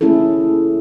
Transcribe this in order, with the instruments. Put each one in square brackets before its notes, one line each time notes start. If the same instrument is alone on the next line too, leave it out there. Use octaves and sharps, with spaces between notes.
[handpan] A3 A#3 C#4 E4 G#4 A4